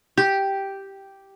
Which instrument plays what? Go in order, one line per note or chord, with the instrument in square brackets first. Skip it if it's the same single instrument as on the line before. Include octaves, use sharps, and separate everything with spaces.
[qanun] G4